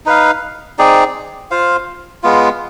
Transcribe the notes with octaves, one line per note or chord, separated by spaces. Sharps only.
D#4 B4 F5
C4 D#4 G#4 D5
F4 C5 F5
G#3 B3 F4